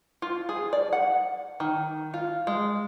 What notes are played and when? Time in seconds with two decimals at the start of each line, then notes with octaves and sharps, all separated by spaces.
0.22 F4
0.49 G#4
0.73 D5
0.93 F#5
1.60 D#3
2.14 F4
2.47 G#3